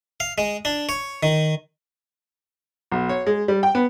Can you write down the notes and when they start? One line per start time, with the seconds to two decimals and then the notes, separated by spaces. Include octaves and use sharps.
0.20 F5
0.38 G#3
0.65 D4
0.89 C#5
1.23 D#3
2.91 B1
3.09 C#5
3.27 G#3
3.48 G3
3.63 G5
3.75 B3